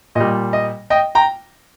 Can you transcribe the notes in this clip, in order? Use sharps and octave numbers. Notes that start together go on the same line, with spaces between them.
A#2 G3 D#5
D#5
D#5 G5
G5 A#5